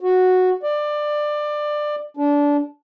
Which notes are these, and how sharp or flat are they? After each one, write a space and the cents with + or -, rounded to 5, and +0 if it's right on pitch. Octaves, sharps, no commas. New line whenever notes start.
F#4 -5
D5 +20
D4 -20